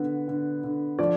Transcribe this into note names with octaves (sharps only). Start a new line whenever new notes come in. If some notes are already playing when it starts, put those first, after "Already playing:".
Already playing: D3 B3 B4
D3
D3
F3 D5